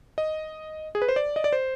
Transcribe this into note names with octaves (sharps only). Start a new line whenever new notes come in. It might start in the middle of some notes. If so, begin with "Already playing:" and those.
D#5
G#4
B4
C5
D5
D#5
D5
C5